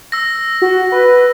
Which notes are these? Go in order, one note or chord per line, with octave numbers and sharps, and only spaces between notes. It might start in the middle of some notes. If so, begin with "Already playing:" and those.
E6 A#6
F#4
B4